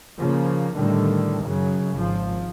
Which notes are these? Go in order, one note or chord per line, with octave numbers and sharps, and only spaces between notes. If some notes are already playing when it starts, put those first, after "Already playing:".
C#3 F3 A#3
A2 D3 D#3 G3
F#2 C#3 F#3
G#1 F3